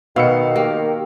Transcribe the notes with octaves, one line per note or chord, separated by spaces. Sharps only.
B2 D#3 B3 F5 E6 C#7
A#3 G4